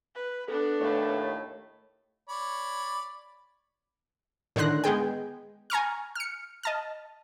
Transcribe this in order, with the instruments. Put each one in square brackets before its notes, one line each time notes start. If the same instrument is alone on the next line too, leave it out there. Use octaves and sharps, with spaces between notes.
[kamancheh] B4
[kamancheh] B3 D4 [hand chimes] A4
[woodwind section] D#2 A2 A3
[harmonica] C#5 D5 B5
[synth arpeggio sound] A2 D3 D#3 C6 F#6 A#6
G#3 B3 G#4 G5
G#5 A#5 C#6 F6
F6 C#7
D#5 A5 F6